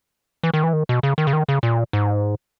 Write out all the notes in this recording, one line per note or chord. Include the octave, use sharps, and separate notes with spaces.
E3
D#3
E3
D#3
B2
C#3
D#3
C#3
D#3
C#3
A#2
G#2